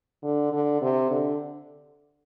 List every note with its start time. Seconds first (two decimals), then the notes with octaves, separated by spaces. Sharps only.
0.23 D3
0.52 D3
0.82 C3
1.10 D3